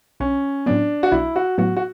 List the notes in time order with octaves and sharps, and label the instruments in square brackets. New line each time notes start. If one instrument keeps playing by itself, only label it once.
[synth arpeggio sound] B1 [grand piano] C#4
[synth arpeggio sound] A2 F#3 B3 [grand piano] D4
[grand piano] F#4
[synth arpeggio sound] B1 [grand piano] E4
[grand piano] F#4
[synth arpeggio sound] A2 F#3 B3 [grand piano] F#4
[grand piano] F#4